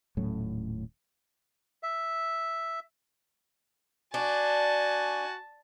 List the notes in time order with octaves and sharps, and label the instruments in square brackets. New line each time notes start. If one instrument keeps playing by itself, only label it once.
[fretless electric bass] D#1 A2 F#3 C#4
[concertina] E5
[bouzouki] D4 [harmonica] F#4 G#5 [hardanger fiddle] A5